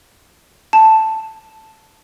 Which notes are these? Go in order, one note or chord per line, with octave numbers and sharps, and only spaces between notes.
A5